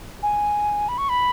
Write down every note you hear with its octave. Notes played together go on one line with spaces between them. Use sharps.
G#5
B5
C#6
B5